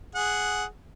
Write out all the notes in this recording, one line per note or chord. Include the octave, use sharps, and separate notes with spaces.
G#4 F#5